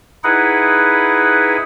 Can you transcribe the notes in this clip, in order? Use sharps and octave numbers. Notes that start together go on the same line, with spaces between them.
D#4 E4 G#4 B4 F#5